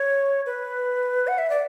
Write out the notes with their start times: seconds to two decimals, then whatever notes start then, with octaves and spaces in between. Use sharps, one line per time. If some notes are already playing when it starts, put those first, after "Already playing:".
Already playing: C#5
0.46 B4
1.27 F#5
1.38 E5
1.50 D5